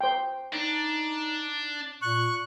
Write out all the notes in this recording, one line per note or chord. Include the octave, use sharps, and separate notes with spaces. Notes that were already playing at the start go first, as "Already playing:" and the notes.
C5 G5
D4 D#4
A#2 C#6 F#6